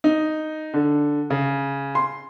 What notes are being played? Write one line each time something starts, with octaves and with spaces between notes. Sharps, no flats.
D#4
D3
C#3
C6